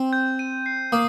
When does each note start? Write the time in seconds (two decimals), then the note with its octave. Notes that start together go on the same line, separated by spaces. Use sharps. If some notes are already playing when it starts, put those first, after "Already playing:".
Already playing: C4
0.13 G6
0.39 D#7
0.66 C7
0.92 A#3 D#6